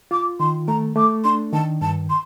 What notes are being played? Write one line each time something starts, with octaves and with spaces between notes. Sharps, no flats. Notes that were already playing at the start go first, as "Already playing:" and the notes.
F4 D6
D#3 C6
A3 A#5
A3 D6
D4 C6
D#3 A5
G2 A5
C6